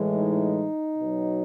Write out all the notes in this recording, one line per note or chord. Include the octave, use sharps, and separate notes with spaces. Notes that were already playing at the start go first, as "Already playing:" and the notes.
Already playing: A2 E3 G#3
D#4
B2 F#3